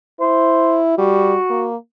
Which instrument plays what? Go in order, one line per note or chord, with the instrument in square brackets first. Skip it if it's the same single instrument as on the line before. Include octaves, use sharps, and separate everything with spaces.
[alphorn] E4 [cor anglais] C5
[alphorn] G3 [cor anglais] F#4
[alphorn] A#3